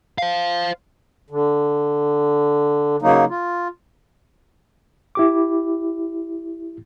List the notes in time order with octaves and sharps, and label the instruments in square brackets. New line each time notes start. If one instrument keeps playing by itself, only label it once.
[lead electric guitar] C5 F5
[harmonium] D3
C#3 F#3 A#3 D#4
F4
[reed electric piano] E4 G4 D6